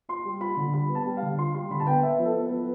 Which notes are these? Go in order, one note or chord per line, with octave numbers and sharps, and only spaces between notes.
F4 C6
G3
F4 B5
D3
G3 B5
B3
A5
G3
F5
D3
F4 C6
G3 C6
D3 B5
A5
B3 G5
B3 E5
F3
A4
B3
B4
F3